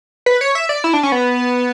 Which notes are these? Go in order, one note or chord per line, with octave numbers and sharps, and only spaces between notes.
B4
C#5
E5
D5
E4
D4
C#4
B3